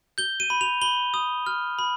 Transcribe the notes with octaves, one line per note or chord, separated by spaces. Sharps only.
G6 G7
D#7
B5
F7
B5 G7
D#6
F6
B5